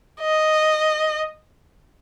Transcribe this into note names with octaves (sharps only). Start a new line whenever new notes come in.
D#5